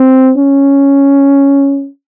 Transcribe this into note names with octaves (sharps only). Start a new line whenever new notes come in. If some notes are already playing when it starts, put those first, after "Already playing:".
Already playing: C4
C#4